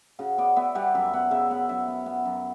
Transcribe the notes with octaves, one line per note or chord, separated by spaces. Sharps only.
C#3 F#4
B3 D5
B3 E5
G3 F#5
F#2 E5
B3 F#5
C#3 E5
B3 F#5
F#2 E5
B3
B3
F#2